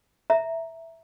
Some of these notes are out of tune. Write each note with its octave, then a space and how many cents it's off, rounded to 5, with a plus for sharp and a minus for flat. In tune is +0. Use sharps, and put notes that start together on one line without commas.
E5 -5 A#5 +0